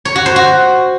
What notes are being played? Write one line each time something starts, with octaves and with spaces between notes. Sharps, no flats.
C#5
F#4
C5
F#4